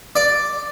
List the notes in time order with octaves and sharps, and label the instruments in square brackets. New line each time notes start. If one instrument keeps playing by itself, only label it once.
[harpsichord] D5